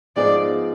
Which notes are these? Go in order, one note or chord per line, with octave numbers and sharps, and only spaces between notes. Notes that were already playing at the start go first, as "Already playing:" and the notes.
G#2 F3 B3 D#4 G#4 D5